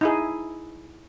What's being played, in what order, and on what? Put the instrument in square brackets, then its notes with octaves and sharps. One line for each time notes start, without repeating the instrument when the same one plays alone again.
[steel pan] D#4 E4 G#4